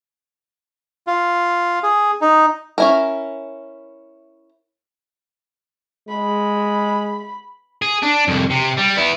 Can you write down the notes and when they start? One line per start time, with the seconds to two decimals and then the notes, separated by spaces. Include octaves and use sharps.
1.07 F4
1.83 G#4
2.21 D#4
2.78 C#4 E4 A#4
6.09 G#3 B5
7.82 G#4
8.03 D4
8.28 C2 F2
8.50 C3
8.77 G3
8.97 B3 E4